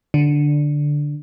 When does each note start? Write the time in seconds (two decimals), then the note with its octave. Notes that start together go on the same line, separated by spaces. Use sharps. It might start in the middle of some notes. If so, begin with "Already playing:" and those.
0.14 D3